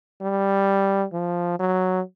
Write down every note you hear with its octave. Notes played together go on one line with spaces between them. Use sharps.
G3
F3
F#3